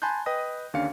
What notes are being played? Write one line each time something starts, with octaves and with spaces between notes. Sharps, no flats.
G#5 A5 B5 C6 F#6 G6
B4 D#5 G5 D#6 A#6
D#2 D3 C#4 D4 F5 C#7